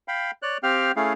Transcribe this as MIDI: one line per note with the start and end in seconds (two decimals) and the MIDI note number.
0.08 0.31 77
0.08 0.31 79
0.08 0.31 83
0.42 0.58 73
0.42 0.58 74
0.42 0.58 90
0.63 0.92 60
0.63 0.92 67
0.63 0.92 77
0.63 0.92 79
0.63 0.92 89
0.96 1.13 57
0.96 1.13 61
0.96 1.13 64
0.96 1.13 68
0.96 1.13 77